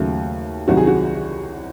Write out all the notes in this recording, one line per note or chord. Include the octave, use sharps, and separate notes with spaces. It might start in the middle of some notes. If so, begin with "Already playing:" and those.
Already playing: D#2 C#3 F#3 A3
C2 C3 D#3 F#3 F#4
G#4
F#4